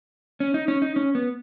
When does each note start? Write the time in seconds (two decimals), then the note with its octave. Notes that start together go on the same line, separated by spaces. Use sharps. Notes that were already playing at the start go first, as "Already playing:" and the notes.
0.40 C#4
0.54 D#4
0.68 C#4
0.82 D#4
0.96 C#4
1.15 B3